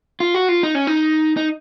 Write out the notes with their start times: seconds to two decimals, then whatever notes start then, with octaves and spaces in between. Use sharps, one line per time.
0.20 F4
0.34 F#4
0.49 F4
0.63 D#4
0.75 C#4
0.87 D#4
1.37 D#4